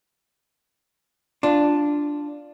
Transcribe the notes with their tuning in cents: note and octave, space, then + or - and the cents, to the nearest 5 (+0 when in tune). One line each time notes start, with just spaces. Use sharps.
D4 +0 F4 +0